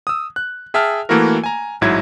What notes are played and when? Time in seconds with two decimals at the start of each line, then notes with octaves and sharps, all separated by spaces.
0.07 D#6 E6
0.36 F#6
0.74 G#4 E5 G5 A5 F6
1.09 E3 A3 A#3 E4 F#4 A#4
1.44 G#5 A#5
1.81 A1 G#2 F#3 E4 G#6